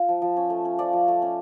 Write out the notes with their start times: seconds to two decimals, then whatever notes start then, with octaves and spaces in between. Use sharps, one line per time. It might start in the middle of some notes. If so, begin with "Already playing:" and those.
Already playing: F4
0.09 F3
0.22 F3
0.37 C#4
0.50 A3
0.65 C#4
0.79 F3 D5
0.93 F3
1.08 A3
1.22 C#4